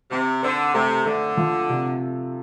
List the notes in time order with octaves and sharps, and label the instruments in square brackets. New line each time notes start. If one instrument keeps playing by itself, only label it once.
[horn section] C3 [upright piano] C4
[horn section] D3 [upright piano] C5
[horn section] C3 [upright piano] A3
[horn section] D3 [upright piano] A3
[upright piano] F3
C3